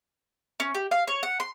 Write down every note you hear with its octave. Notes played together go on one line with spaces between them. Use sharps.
C#4
G4
F5
C#5
F#5
C6